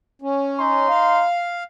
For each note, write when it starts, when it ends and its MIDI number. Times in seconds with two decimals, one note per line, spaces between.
0.22 0.88 61
0.58 1.26 63
0.58 1.26 82
0.58 1.26 84
0.89 1.64 77